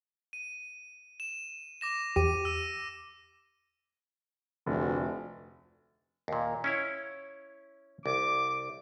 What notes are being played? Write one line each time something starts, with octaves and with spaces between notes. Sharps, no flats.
D#7
E7
D6 A#6 E7
E2 G4 D6 D#7
E6 D#7
F1 D2
D#2 A#2
C#4 E4 C#5
C2 D6